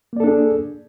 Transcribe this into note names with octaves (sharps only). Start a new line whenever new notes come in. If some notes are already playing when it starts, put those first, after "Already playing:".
A#3 D4 G#4 A4 D5